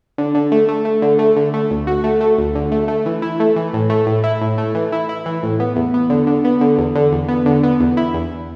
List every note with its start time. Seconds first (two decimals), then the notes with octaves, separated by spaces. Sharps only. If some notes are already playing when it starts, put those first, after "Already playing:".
0.18 D3
0.35 D3
0.52 A3
0.69 A3
0.85 A3
1.02 D3
1.19 A3
1.37 D3
1.54 A3
1.71 D2
1.87 F#4
2.04 A3
2.21 A3
2.38 D2
2.55 D3
2.72 A3
2.88 A3
3.06 E3
3.22 E4
3.40 A3
3.56 E3
3.73 A2
3.90 A3
4.07 A2
4.24 E4
4.41 A2
4.58 A3
4.75 E3
4.92 E4
5.09 E4
5.26 E3
5.43 A2
5.60 B3
5.76 E2
5.94 B3
6.10 D3
6.27 D3
6.45 B3
6.61 D3
6.78 E2
6.95 D3
7.12 E2
7.28 B3
7.46 D3
7.63 B3
7.80 E2
7.97 E4
8.14 E2